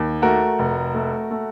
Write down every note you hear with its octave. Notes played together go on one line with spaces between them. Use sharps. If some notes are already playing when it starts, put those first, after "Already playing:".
Already playing: D#2
A3 F#4 A#4
F1
A3
A3